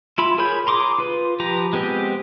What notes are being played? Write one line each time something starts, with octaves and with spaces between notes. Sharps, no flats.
E4 F4 B5
G#4 A#4 C#5 B5 G6
A#5 C6 D6 D#6
F4 B4
F3 G4 B4 A#5
G#3 B3 C4 G4 D#5